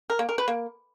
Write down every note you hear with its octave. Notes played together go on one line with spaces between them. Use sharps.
A#4
A#3
A#4
B4
A#3